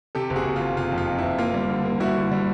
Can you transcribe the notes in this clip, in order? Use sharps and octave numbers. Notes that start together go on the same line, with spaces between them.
C3 G4 A4
F#1
F#4 G#4
F#1
F4
F#1
C3 F4
F2
F4
C3
F#1 E4
A#3 F4
G3
D3
A#3
G3 E4 F#4
D3
G3